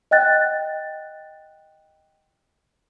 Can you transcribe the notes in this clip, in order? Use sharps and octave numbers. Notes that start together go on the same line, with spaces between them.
D#5 F#5 G5 F#6 A6